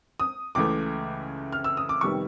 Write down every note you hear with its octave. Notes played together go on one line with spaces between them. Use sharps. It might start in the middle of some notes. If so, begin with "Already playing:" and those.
D#6
C#2 C#3 E3 A3 D6
F6
E6
D#6
D6
F2 C3 D#3 G3 B3 C#6